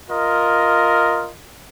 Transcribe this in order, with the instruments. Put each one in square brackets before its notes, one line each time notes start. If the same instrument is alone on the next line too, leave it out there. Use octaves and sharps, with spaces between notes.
[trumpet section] F4 A#4 D#5